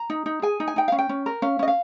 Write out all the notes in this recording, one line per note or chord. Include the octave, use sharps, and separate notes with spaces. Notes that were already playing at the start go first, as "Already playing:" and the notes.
Already playing: A#5
D#4
D#4
G#4 G#5
D#4
G#5
D#4 G5
C#4 F5
G5
C#4
A#4
C#4 F5
C#4 D#5
F5